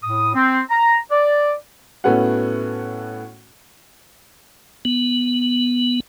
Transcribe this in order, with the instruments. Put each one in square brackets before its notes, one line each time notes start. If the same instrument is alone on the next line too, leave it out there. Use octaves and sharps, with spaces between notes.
[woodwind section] A2 D#6
C4
A#5
D5
[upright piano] A2 A3 B3 C#4 F#4 F#5
[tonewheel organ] B3